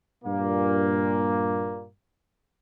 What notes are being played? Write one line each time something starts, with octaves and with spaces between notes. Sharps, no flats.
G2 A#2 A#3